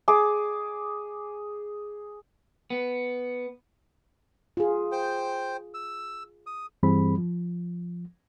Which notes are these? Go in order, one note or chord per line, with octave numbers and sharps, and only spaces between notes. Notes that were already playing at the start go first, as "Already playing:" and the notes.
G#4 D6
B3
F4 G#4
C5 G5
E6
D#6
G2 E3 G3 C4 G#4 B5
F3